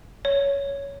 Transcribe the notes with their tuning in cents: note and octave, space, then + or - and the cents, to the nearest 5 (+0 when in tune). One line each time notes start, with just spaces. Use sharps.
C#5 +10